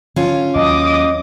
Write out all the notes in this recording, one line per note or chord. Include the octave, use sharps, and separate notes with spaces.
D3 C#4 F4
D#2 F#3 D#5 D6 D#6